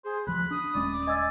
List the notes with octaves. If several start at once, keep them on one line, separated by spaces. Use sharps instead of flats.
G#4 C5
D2 F3 B5 F#6
D4 D#6
D#1 G#3 C#4 D5
D6
D#5 G#5 E6 A6